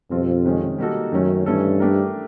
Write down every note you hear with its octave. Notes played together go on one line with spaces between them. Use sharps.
F2 B2 G3 C4 F4 A4
C3 D#3 G#3 C#4
G3 A#3 D#4 F#4 A4
F#2 D#3 F#3 A3 C#4
G2 E3 A3 C#4 E4 A4
A3 D4 G4 A#4